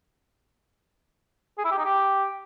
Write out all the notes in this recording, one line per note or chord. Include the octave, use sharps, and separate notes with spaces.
G#4
E4
G4
D#4
G4